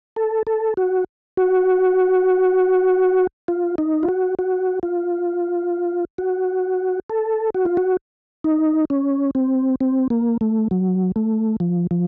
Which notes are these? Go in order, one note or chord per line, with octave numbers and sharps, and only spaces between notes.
A4
A4
F#4
F#4
F4
D#4
F4
F#4
F#4
F4
F#4
A4
F#4
F4
F#4
D#4
C#4
C4
C4
A#3
A3
F#3
A3
F3
F3